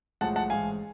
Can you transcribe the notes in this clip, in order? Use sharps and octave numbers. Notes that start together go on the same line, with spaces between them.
B1 A2 F3 G#3 F#5 A5
F#5 A5
A1 G#2 G#3 F5 G#5